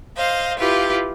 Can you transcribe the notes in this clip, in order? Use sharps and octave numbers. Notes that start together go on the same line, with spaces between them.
C5 D#5 F5
E4 F4 G4 B4 F5